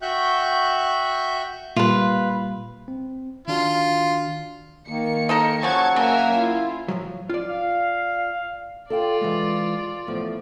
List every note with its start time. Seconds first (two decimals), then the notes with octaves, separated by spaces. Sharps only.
0.02 F#4 E5 G5 C#6 F#6 G6
1.76 A#2 G3 F4 B4
2.88 C4
3.48 D#3 D4 F4 F#4
4.88 D#3 A#3 C#7
5.29 D#4 A4 A#4
5.63 C#3 F3 F#3 F#5 A5 C#6 G#6
5.96 C#3 A#3 A#4 E5 G#5
6.38 E4 F4
6.88 A2 F3 F#3
7.29 F4 D5
7.50 F5
8.90 F4 A4 D5 F5 G5
9.21 E3 G#3
10.07 E2 A2 F3